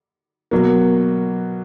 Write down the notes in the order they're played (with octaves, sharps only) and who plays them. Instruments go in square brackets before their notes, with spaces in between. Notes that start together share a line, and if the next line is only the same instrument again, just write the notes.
[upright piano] B2 F#3 A#3